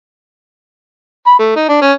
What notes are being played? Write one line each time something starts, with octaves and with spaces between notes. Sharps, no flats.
B5
A3
D#4
D4
C#4